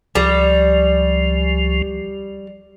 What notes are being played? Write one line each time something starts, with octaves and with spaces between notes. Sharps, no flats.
C#2 F3 G3